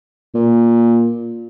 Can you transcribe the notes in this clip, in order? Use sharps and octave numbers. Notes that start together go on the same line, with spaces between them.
A#2